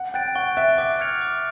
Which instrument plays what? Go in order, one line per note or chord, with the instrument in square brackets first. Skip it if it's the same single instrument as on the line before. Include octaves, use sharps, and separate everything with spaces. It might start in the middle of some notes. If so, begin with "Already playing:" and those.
Already playing: [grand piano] F#5
[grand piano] G5 [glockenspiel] F#6 A6 D7
[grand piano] F#5 [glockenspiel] C#6
[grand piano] E5 [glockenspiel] F#6 A6 D7
[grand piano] E5 [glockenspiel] D6
[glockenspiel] F6 G#6 C#7 F7
D6